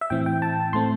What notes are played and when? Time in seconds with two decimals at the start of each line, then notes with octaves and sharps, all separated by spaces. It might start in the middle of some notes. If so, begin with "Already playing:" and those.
0.01 E5
0.10 A2 E3 C4 G5
0.26 G5
0.42 A5
0.73 A2 A3 C4 C6